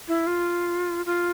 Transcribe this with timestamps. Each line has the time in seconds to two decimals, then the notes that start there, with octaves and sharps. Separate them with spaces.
0.08 E4
0.27 F4
1.06 F4